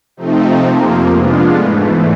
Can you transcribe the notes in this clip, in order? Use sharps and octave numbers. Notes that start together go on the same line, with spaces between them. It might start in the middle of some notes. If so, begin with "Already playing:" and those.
C3 F3 A3 C4 D#4
F2 C3 F3 A#3
G#3 B3 D4 F4
G#2 E3 A3